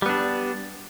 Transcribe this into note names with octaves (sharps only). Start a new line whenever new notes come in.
G3 B3 D4